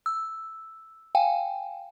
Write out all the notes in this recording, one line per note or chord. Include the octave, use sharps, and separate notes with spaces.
E6
F5 G5 G#5